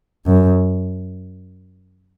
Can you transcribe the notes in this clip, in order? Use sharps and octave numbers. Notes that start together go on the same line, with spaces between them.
F#2